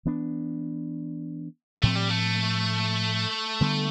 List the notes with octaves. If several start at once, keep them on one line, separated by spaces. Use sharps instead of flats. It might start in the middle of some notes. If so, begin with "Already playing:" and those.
E3 B3 D4
A2 F3 A3 C4
G3
A3
D3 G3 B3